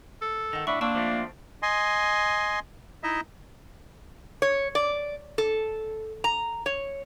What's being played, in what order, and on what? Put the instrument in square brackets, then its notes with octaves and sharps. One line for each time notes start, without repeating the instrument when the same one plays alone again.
[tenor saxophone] A4
[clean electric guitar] D#3 [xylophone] F#5 A#6
[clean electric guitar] A2 [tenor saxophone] D4 [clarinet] E5 [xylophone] B5 C#6
[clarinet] A#3 [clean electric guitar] C4 [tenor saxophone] D4 [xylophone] A5 C#6 E6
[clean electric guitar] F3 A3 C4
[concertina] D#5 G#5 C6
D#4 E4 D#5 E5
[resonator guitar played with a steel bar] C#5
D5
A4
A#5
C#5